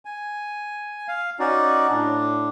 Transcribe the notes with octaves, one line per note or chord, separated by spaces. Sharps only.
G#5
F5
C#4 D#4 F#4 D5
A2 D4